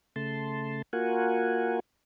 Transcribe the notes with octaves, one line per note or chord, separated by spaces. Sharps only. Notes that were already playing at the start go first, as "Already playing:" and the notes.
C#3 A3 A5 C6
A#3 F4 F#4 A#4 F#5 G#5